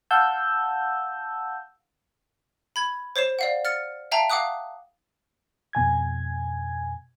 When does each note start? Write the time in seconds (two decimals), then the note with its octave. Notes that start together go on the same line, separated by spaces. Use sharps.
0.11 F5 F#5 A5 E6 G6
2.76 B5 G#6
3.16 C5 C#5 C7 E7
3.39 D5 F5 F#5
3.65 F6 A6 C#7
4.11 E5 F5 G5 A5 A#5
4.30 F5 F#5 D6 D#6 F#6
5.73 F2 B2 G#5 G#6